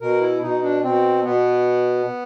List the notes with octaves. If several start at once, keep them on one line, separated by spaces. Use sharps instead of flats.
B2 A#4
E4
B2 D#4
D4
B2 C4
B2 B3